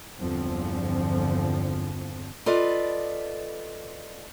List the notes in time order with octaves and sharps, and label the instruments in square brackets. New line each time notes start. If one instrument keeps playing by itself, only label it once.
[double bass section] G1 E2 D3 F3 C4
[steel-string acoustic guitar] F4 A4 B4 D5 D#5